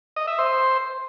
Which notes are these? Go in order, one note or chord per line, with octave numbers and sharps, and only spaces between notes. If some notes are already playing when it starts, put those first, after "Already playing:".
D#5
E5
C5